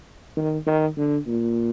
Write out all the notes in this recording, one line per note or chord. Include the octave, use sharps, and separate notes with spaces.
D#3
D#3
D3
A#2